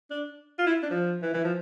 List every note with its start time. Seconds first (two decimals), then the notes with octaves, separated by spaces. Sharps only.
0.11 D4
0.59 F4
0.66 E4
0.82 D4
0.90 F3
1.22 E3
1.34 E3
1.44 F3